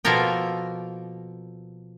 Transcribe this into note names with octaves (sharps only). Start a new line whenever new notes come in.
B2 F3 A#3 A4 A#4 G5